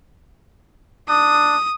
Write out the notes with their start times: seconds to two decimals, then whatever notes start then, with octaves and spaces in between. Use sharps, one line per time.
1.09 D4 D#6